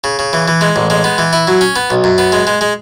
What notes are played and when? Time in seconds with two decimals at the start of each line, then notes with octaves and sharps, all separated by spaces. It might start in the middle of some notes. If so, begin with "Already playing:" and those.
0.04 C#3
0.19 C#3
0.33 E3
0.48 E3
0.61 G#3
0.76 A1
0.90 G#3
1.04 B3
1.18 E3
1.33 E4
1.47 F#3
1.61 C#4
1.76 B3
1.90 B1
2.04 F#2
2.18 B3
2.32 G#3
2.47 G#3
2.61 G#3